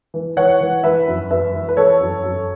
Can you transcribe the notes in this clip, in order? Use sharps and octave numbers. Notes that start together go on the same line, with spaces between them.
E3
E3 C#5 F#5
E3
E3 B4 E5
F#2
F#2 B4 E5
E3
B4
E3 A4 C#5
F#2
F#2